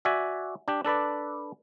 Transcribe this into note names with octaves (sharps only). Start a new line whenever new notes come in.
F#4 D5 E5 G#5
D4 G4
D4 A4 B4 D5